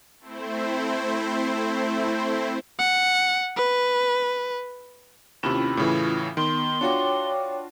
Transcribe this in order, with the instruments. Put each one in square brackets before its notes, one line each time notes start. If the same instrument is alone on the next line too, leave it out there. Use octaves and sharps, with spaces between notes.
[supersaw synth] A3 C4 E4 C5
[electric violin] F#5
B4
[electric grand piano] D#2 C3 [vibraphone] C#4 E4 F4 [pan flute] B5
[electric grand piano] A2 C#3 E3
[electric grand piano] D#3 [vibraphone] B3 [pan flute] C6
[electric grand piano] D4 F4 F#4 [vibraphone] C#5 G5 D6